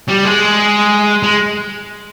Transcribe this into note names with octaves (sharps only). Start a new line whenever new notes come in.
G3
G#3
G#3